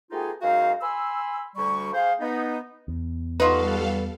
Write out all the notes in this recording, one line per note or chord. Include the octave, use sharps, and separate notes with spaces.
A3 B3 D#4 F4 G4 G#4
F#2 G#3 D#4 F#4 F5
G#5 B5 C6 E6
D2 G3 C#6
G#4 C5 F5
B3 D#4
E2
G3 D#4 F4 F#4 A4 B4 F5